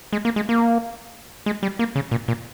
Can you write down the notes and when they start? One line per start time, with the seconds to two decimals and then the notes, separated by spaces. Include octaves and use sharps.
0.13 G#3
0.25 A#3
0.36 G#3
0.49 A#3
1.46 G#3
1.63 G3
1.79 A#3
1.96 C#3
2.11 A#2
2.28 A#2